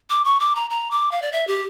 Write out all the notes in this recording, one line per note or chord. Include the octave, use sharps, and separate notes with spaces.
D6
C#6
D6
A#5
A#5
D6
F5
D5
E5
G4